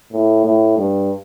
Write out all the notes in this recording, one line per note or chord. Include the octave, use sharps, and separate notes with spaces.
A2
A2
G2